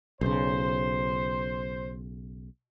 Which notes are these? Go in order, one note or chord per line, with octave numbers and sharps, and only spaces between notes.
B1 C#3 C5